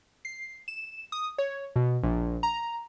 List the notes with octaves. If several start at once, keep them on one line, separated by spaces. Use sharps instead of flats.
C7
E7
D#6
C#5
B2
A#1
A#5